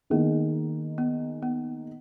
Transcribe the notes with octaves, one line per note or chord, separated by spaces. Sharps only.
D#3 A#3 B3 D#4 G#4
B3
B3